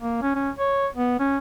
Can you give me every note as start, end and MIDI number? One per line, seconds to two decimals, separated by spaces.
0.01 0.19 58
0.22 0.34 61
0.35 0.50 61
0.59 0.87 73
0.97 1.18 59
1.20 1.38 61